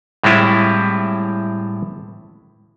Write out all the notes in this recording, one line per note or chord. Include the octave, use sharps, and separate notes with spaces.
A2 G3 G#3 C4 E4 F4